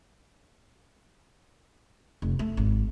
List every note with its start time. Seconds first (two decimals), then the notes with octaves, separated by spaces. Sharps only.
2.22 F1
2.39 A3
2.57 G#1